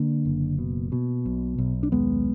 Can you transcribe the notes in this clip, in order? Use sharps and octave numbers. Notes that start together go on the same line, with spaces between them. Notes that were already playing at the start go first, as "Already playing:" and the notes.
Already playing: D3 A#3 D4
F#1
B2
B2
B1
B1
D4
D#2 G#3 B3